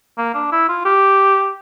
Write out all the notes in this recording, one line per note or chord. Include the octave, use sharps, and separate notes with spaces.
A#3
D4
E4
F4
G4